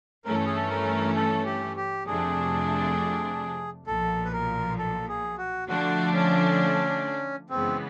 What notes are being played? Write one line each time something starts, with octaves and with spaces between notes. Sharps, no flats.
G2 E3 A3 C#4 A#4
A4
G#4
A4
A#4
A4
G4
G4
F2 C3 F3 A3 D4 G#4
B1 A#2 F3 A4
B4
A#4
A4
G#4
F#4
D3 F3 A3 D4 F#4
C#4
F#2 C#3 E3 G#3 B3 C4